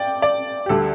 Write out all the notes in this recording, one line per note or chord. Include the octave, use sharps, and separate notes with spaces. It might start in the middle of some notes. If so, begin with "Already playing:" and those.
Already playing: D5 G5
D5
G4
D2 D3 G3 A4